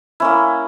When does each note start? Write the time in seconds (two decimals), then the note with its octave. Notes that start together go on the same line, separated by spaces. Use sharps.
0.20 A#3 C#4 E4